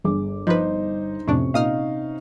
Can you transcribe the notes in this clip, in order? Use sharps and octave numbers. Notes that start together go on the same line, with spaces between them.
G1 G#4 D6
F3 D#4 B4 C5
F2 A2 C3 C#4 D4 C#6
A#2 D#4 D#5 F5 D#6 F6